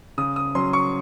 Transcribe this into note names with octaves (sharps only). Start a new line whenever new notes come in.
C#3 D#6
D#6
F#3 C#4 C6
C#6